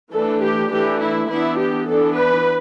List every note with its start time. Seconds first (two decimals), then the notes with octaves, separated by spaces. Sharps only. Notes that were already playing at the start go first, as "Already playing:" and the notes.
0.13 E3 A3 D4 A4
0.43 G4
0.71 E3 A3 D4 G4
1.00 E4
1.29 E3 B3 D4 E4
1.58 G4
1.88 E3 B3 D4 A4
2.17 B4